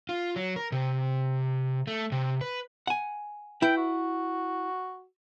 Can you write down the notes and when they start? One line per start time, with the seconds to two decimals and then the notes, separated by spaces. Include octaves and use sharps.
0.09 F4
0.36 F#3
0.56 A#4
0.72 C3
1.87 A3
2.12 C3
2.41 B4
2.87 F#5 G#5
3.62 E4 B4 G5
3.77 F#4